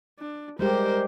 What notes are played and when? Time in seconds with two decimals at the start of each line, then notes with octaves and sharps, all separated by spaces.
0.19 D4
0.59 G3 G#3 G4 A#4 C5